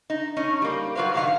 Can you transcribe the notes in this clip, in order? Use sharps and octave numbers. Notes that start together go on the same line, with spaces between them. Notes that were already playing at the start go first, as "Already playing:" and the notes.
D#4
A2 C#4 D#4
G3 A#3
F#3 F4 B4 C5 F5
G2 A#2 D#3 G4 F5 F#5